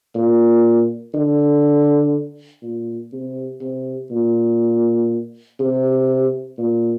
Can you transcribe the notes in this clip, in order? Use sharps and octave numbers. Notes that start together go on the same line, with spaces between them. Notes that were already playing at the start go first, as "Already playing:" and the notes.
A#2
D3
A#2
C3
C3
A#2
C3
A#2